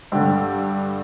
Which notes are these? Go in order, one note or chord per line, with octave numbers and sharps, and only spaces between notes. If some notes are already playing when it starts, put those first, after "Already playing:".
G2 D3 G4